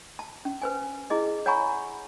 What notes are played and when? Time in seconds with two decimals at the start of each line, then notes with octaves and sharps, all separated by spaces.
0.19 A5
0.45 C#4
0.62 B4 C5 G#5
1.10 E4 G#4 D#5
1.46 C#5 F#5 G#5 A#5 B5 C#6